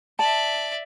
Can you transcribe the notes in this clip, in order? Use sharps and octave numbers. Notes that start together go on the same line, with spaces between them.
D5 E5 A5